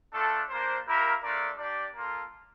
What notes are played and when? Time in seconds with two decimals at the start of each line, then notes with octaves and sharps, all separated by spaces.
0.13 A3 D4 F4 A4
0.49 A#3 D4 F4 C5
0.85 E4 G4 A#4 F5
1.22 A3 D4 F4 A#4 D5
1.58 D4 G4 D5
1.94 A#3 F4 A4